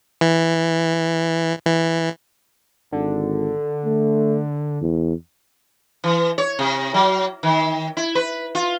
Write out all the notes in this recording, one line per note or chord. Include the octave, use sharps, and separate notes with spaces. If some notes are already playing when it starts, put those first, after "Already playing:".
E3
E3
G#1 D3
A3
E2
E3
C#5
C3
F#3
D#3
E4
B4
F4